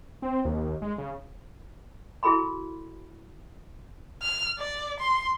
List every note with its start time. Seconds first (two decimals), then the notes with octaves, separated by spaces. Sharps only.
0.22 C4
0.45 D#2
0.82 G#3
0.98 C#3
2.23 E4 F#4 G#4 A4 B5 C6
4.23 F6
4.59 D5
5.00 C6